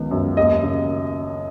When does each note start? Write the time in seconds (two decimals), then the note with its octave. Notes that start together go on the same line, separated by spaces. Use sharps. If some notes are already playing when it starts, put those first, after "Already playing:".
Already playing: C#2 D#3 B3
0.11 F#2
0.37 D#2 D#5
0.63 C#3